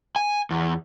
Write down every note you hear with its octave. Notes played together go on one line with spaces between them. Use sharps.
G#5
E2